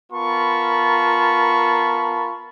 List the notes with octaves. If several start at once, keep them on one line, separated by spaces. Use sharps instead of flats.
B3 F4 A#4 A5 B5 C#6